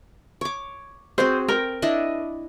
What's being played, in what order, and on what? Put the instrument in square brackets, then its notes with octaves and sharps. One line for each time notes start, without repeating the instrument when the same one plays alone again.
[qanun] C#5 D6
[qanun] C4 F#4 G#4 [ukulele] C5
[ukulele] A#4 [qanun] G5
[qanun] D4 E4 D#5